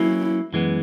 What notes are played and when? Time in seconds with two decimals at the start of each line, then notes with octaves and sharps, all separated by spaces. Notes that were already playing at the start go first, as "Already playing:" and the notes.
Already playing: F#3 A#3 C#4 E4
0.53 F#2 E3 G#3 B3